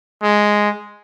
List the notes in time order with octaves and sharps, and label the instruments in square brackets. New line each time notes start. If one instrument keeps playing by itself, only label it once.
[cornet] G#3